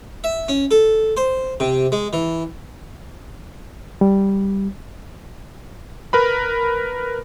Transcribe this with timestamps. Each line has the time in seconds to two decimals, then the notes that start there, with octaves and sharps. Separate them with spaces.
0.24 E5
0.48 C#4
0.71 A4
1.17 C5
1.60 C3
1.92 G#3
2.13 E3
4.01 G3
6.13 A#4 B4 B5